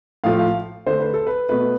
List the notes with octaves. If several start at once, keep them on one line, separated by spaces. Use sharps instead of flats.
A2 F3 A3 F5
F5
D3 A3 C5
B4
A4
B4
B2 A3 B4